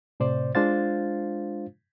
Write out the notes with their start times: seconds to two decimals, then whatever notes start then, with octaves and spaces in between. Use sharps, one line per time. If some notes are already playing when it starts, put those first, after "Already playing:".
0.20 A2 C3 C5 D5
0.55 G#3 D4 F4 C5 F5 A6